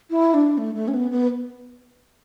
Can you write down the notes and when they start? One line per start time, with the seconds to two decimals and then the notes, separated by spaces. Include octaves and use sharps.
0.10 E4
0.34 D4
0.58 A3
0.75 A3
0.88 C#4
0.94 B3
1.11 B3